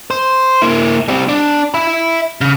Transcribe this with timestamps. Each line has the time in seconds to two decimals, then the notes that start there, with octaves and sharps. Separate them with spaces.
0.10 C5
0.62 A#3 E4
1.08 G3 C4
1.29 D4
1.74 E5 B5
2.41 C#3